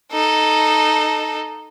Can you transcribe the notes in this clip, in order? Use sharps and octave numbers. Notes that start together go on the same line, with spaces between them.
D#4 A4